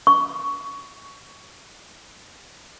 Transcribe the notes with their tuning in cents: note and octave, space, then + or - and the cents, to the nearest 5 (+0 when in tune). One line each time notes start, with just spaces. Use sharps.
C#6 +15